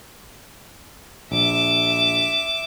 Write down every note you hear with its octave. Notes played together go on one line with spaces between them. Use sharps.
A#1 E5 D6